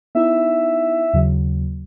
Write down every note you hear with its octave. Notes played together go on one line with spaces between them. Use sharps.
B3 D#4 E4 E5
D#2 C#3 F#3